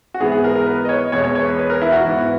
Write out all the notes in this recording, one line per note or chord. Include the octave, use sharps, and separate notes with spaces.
F#4
G#2 E3 B3 G#4
G#4
A#4
A#4
B4
D#5
C#5
E2 B2 G#3 B3 C#5
C#5
C#5
B4
B4
A#4
E4
F#4
G#2 E3 B3